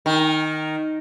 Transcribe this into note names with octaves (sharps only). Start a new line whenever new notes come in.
D#3